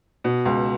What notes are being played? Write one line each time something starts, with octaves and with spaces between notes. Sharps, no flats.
B2
C#2